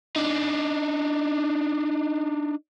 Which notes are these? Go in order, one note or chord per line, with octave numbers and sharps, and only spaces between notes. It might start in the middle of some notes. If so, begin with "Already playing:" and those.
D4 D#4